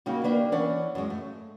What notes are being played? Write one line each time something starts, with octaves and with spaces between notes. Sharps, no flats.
C#3 G3 A#3 D#4 F#4
D#3 A#3 D4 B4
E3 C#4 D5 F#5
F#2 G#3
A3